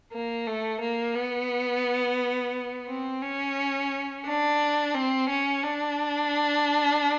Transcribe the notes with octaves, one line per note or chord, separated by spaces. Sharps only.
A#3
A3
A#3
B3
C4
C#4
D4
C4
C#4
D4